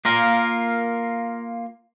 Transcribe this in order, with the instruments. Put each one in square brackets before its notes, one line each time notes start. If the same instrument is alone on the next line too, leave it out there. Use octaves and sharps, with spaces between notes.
[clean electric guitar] A#3 F4 A#4